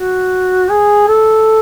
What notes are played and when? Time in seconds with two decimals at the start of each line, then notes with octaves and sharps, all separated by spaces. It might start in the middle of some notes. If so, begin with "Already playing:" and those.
Already playing: F#4
0.70 G#4
1.08 A4